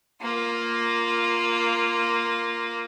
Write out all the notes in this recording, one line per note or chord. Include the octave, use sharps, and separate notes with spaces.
A#3 F4